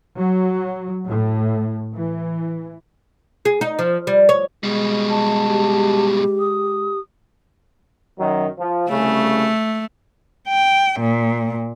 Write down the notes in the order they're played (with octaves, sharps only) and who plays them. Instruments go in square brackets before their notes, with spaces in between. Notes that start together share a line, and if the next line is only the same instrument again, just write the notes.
[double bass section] F#3
A2
E3
[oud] G#4
D#4
F3
G3
C#5
[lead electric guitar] B2 G3 [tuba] G#3
[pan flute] A5
[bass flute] G4
[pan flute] D#6
[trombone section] F#2 D#3 F#3
F3
[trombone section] C2 C#3 [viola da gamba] A3
[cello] G5
A#2